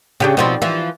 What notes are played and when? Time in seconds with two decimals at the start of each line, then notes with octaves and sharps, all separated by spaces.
0.20 C#3 D4 G4 G5
0.37 B2 D#3 F3 G3 C4
0.62 E3 F3